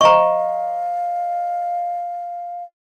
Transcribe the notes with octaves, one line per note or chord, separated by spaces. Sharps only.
C5 D#5 F5 A#5 C#6